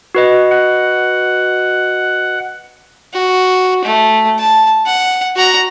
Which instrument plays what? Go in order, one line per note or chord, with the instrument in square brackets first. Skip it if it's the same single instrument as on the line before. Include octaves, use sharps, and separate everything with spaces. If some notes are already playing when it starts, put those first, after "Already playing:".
[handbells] F#4 B4 D#5
[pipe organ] F#5
[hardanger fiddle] F#4
A3
A5
F#5
F#4 A#5